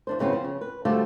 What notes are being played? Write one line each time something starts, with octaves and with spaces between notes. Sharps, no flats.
E2 D4 C5
F#2 C#3 B3 C4 E4
F3
C#3
B4
D3 G3 A3 F4 F#4 C5